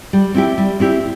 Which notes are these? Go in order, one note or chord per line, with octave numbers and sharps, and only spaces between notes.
G3
C4 E4 G4
G3
C4 E4 G4